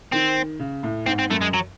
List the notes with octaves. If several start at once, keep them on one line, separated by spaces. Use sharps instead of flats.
D#3 C4
C#3
A2
G#2 C4
C4
F#2 A3
G#3
F#3